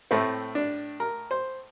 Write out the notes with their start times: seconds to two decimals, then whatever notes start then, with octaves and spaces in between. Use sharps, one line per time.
0.11 A2 A3 C4
0.55 D4
1.00 A#4
1.31 C5